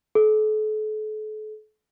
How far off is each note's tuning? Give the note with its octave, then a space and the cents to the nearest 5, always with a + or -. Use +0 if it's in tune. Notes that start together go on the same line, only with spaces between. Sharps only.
A4 -40